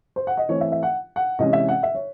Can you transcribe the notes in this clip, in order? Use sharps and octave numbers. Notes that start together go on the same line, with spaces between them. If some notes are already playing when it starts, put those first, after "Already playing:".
C5
F#5
D#5
E3 A3 C4 C#5
E5
E5
F#5
F#5
C3 E3 G#3 C#4 D#5
E5
F#5
E5
C#5